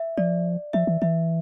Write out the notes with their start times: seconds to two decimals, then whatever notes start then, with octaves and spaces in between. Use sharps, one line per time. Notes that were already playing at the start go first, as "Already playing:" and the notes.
Already playing: E5
0.17 F3 D5
0.73 F3 E5
0.87 E3
1.02 E3 E5